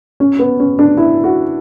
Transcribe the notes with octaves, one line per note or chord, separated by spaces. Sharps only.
C#4
B3
C#4
D4
E4
F#4